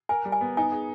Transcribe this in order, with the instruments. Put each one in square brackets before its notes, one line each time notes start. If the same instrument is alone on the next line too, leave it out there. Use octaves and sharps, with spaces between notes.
[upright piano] A#4 [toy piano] G#5
[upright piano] G3
[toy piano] G#5
[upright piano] B3
[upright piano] D#4 [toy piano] G#5
[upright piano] G#4